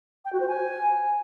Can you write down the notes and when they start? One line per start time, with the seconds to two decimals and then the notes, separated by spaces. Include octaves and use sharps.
0.25 G5
0.33 F#4
0.40 C5
0.48 G#5